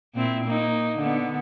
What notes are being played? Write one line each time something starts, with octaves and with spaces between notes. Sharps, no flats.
A#2 C4 E4
A#3 D#4
D3 B3